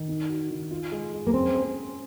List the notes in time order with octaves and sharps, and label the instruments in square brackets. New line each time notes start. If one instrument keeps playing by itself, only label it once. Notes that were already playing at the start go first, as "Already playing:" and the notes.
Already playing: [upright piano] D#3
D#4
F#4
D#3
F4
G#3
G#3
[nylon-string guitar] A#3
[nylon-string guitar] C4 [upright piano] C#4
[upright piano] G#4